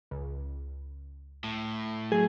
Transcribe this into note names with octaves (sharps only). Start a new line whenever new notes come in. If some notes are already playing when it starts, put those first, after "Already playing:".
C#2
A2
F#3 A3 G#4